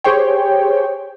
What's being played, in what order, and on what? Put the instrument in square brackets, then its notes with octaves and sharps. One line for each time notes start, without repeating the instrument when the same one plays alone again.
[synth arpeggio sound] G4 G#4 C5 C#5 G5